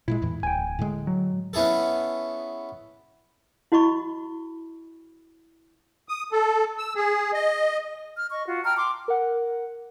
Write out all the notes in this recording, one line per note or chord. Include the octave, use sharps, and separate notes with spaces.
A#2 F#3 G#3 E4
E2 A2 E3
D1 G5 G#5
A2 D3 G#3
F#3
B3 C#4 E4 G#4 A4
E4 F#4 D#5 B5 C#6
D#6
A4
E6
G#4
D#5
F6
D#5 C#6
F4 F#4
G5 A5 A#5 F6
C6 D6
A#4 F#5